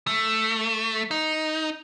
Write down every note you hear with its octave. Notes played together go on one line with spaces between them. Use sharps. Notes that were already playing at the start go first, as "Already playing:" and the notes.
A3
D#4